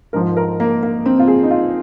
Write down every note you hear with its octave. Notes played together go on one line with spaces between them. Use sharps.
G#2 F3 A#4
A#4
A#3
A#3
C4
F4
G#4
D#4
F4